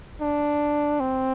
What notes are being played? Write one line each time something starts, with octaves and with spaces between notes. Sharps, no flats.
D4
C4